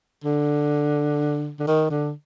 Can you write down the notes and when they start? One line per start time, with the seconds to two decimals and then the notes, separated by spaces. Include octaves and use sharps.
0.24 D3
1.59 D3
1.67 D#3
1.90 D3